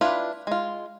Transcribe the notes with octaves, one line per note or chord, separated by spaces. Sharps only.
D4 E4 F4 B4
G#3 F4